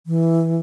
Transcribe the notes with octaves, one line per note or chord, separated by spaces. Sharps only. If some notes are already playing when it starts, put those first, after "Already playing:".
E3